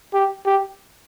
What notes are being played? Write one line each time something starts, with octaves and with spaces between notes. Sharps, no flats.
G4
G4